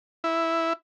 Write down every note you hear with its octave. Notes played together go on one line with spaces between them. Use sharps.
E4